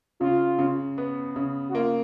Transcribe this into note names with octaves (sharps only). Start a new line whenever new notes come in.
C#3 F4
C#3
B3
C#3
F#4
A#3 F4